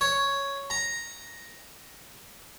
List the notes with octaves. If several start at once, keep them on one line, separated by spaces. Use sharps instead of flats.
C#5
A#5